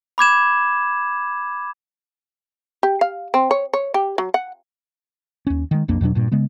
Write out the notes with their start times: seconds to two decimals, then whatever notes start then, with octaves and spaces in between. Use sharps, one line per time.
0.18 B5 D6 G#6 E7
2.83 G4
3.01 F5
3.34 C4
3.51 C#5
3.73 C#5
3.94 G4
4.18 F#3
4.34 F#5
5.47 D#2 C#4
5.71 D#3 G#3
5.88 B1 F2 A#3 D4
6.01 E2 B2 F#3 D4
6.15 G2 A#2
6.32 C#3 G#3 B3